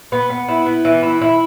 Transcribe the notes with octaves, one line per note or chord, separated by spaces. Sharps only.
B3
B3
E4
B3
E3
E4
E4